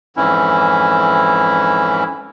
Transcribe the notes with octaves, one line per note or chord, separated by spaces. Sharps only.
F2 G#2 E3 C#4 E4